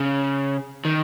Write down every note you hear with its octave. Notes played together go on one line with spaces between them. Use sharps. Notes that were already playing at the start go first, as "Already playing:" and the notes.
Already playing: C#3
D#3